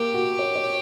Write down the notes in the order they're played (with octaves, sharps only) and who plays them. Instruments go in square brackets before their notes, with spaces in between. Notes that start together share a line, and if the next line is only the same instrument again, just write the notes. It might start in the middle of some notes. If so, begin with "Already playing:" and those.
Already playing: [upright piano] A#3 [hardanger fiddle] G4
[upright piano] F#4
C#5
C#5